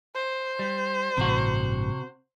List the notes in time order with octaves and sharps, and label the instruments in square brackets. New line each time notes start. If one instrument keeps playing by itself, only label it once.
[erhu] C5
[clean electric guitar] G3
[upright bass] A1 G2 [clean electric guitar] C3 F#4